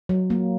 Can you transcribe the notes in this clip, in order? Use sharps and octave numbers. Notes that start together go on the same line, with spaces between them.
F#3
A#3